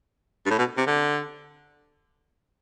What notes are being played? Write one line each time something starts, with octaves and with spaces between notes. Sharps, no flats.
G2
A2
B2
C3
D3